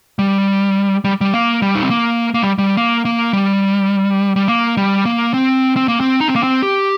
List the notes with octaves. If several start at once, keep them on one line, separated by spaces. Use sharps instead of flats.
G3
G3
G3
A#3
G3
D#4
C4
A#3
A#3
G3
G3
A#3
A#3
G3
G3
A#3
G3
A#3
C4
C4
A#3
C4
D#4
C4
A#3
C4
G4